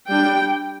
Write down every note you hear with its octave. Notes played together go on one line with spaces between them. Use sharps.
G3 D4 G5